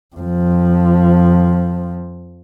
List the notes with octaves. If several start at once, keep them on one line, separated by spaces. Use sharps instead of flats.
F2 F3